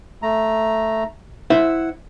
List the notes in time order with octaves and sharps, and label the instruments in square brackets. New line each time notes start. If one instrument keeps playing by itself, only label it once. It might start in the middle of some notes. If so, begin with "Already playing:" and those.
[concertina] A3 A#5
[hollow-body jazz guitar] E4 C5 E5 [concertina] F#5